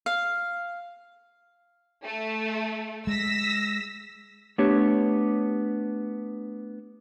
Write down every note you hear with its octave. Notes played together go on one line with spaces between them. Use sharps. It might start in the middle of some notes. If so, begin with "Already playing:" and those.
F5
A3
G#3 E6 A#6 B6
A3 B3 D4 G4 C#5